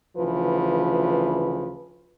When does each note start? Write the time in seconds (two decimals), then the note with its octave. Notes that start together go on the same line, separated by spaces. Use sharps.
0.17 D2 C#3 E3 F3 B4